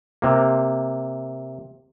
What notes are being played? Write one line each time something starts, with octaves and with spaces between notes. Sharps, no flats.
C3 A#3